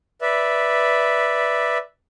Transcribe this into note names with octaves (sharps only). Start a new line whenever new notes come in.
B4 D5 E5